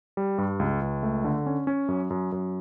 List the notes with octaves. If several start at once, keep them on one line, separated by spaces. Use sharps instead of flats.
G3
G2
C#2
C#2
A3
D3
C#4
C#4
F#2
F#2
F#2